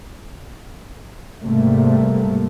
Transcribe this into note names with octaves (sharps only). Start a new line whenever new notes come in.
G#2 C3 G3 A3 A#3